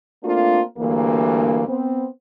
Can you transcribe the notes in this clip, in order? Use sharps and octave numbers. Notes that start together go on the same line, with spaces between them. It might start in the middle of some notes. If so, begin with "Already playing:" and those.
A3 A#3 C4 D4 F4
D2 G2 E3 A#3
B3 C4